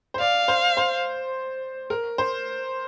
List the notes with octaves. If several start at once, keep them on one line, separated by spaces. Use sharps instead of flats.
C5
D5 F5
C5
C5
A#4
C5